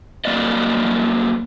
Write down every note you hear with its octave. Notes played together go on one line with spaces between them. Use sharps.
G2 F3 F#3 A#3 D5 D#5